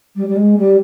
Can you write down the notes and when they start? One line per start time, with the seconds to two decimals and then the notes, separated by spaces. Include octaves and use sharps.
0.15 G3
0.27 G3
0.36 G#3
0.57 G3